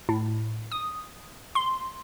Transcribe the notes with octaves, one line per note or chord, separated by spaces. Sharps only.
A2
D#6
C6